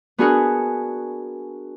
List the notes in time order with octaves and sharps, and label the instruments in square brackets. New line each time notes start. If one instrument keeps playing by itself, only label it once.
[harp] B3 D4 F#4 G#4 A#4 F#5